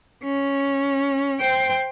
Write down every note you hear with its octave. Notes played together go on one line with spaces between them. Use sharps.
C#4
C5 G5